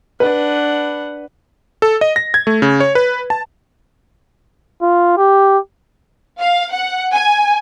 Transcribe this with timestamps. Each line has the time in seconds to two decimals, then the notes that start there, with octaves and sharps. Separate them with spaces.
0.20 D4 B4 F#5
1.82 A4
2.01 D#5
2.16 A#6
2.34 G#6
2.47 A3
2.62 C#3
2.80 C#5
2.95 B4
3.30 A5
4.82 F4
5.17 G4
6.39 F5
6.72 F#5
7.13 G#5